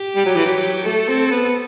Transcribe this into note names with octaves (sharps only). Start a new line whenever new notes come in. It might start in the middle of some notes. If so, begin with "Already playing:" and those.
Already playing: G4
G3
F#3
E3
F#3
A3 A4
C4
B3